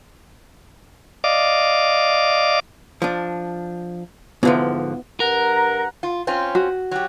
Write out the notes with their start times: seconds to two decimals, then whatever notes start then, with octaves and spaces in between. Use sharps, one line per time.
1.24 D5 D#5 F5 D6
3.02 F3 D4
4.43 G#2 D3 F3 B3 E4 F4
5.20 G2 A#4 F#5 A#5
6.03 F4
6.27 C4 C#4 F4
6.55 F#4
6.91 F#3 G4